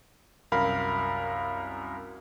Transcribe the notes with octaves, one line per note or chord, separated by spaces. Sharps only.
C2 F#2 A#4 F5 B5